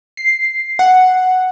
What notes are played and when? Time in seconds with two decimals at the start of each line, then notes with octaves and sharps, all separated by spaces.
0.17 C7
0.79 F#5